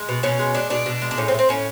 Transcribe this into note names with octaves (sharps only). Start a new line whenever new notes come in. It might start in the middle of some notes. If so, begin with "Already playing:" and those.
Already playing: G#3
B2
B2 C#4
G#3
G#3 D4
B2 D4
B2
G#3
D4
A2 C#4
C4
A3
C4
A2 C#4